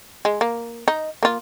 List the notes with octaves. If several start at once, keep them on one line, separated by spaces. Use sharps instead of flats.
G#3
A#3
D#4
A#3 F4